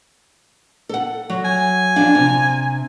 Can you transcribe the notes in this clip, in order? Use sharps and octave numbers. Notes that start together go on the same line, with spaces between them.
A4 F#5
F#3
G#5
F2 D4 F5
C3